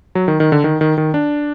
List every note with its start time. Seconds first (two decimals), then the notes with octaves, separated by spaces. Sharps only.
0.15 F#3
0.28 D#3
0.40 D#3
0.52 D3
0.64 D#3
0.81 D#3
0.98 D#3
1.14 D4